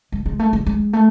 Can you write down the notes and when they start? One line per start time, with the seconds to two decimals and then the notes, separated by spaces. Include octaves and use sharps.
0.12 G#3
0.26 G#3
0.39 A3
0.53 G#3
0.66 G#3
0.93 A3